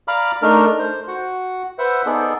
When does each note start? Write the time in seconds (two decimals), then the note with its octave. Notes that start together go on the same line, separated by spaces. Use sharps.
0.08 D5 F5 A#5 B5 D6 F6
0.42 A3 D4 D#4 A#4 F6
0.79 C5
1.08 F#4 F#5
1.78 B4 C5 E5 F#5
2.06 B3 D#4 G#4 A4 D5